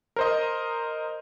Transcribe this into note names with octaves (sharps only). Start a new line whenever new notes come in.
A#4 C5 D#5